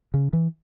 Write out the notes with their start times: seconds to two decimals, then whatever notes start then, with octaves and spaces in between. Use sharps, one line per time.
0.14 C#3
0.33 E3